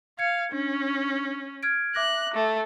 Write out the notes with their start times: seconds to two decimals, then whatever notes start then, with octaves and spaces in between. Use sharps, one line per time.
0.19 F5 G#6 C#7
0.52 C#4 D4
1.63 F6 G#6 D7
1.95 E5 D6 F#6 A#6
2.34 A3